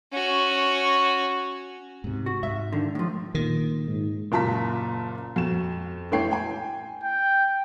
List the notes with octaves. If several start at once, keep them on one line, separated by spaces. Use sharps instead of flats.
C#4 F#4
G#2 C3
F#4
G#2 E5
D3 D#3
A2 F3
A#2 D#3
G#2
F#1 A#2 F4 A5 A#5 B6
F2 F#4 E7
A1 E3 A3 C#5 G5 C7
G5 G#5
G5